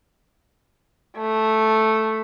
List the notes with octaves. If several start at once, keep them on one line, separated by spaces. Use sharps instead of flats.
A3